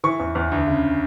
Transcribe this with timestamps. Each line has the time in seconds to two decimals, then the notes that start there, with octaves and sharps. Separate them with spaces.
0.04 E3 C#6
0.19 E2
0.35 E2
0.52 D2
0.67 C#3